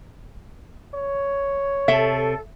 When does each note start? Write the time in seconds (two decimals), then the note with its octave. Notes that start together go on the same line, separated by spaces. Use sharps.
0.94 C#5
1.88 C3 A4 E5